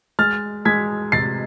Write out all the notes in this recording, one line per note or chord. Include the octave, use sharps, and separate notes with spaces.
G#3 F6 A6
G#3 G#6 B6
C3 A6 C7